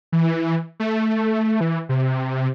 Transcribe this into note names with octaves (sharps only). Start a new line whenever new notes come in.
E3
A3
E3
C3